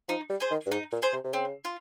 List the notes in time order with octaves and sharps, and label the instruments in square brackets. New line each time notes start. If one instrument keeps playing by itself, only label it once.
[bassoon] F3 [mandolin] D#4
[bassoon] G3
[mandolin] G#4 C5
[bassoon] D#3
G2
[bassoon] G#2 [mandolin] D#4
[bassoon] A#2
[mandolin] G#4 C5
[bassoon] C3
C3
[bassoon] C#3 [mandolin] C4
[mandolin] F4